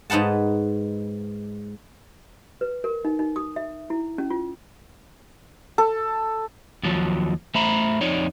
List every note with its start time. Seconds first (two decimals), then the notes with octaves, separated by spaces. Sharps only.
0.10 G#2 D#4 B4 F#5 A5
2.61 B4
2.84 A#4
3.05 D#4
3.19 D#4
3.36 D#6
3.56 E5
3.90 E4
4.18 C#4
4.30 F4
5.78 A4
6.83 D#2 F3 F#3
7.55 A3 C5 E5 A#5 B5
8.01 F2 D#4 C#5 D5